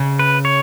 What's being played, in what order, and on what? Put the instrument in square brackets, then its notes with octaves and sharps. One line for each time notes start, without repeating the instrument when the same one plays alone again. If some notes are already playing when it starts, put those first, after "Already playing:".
Already playing: [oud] C#3
[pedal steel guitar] B4
C#5